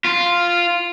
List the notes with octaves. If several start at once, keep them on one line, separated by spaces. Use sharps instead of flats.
F4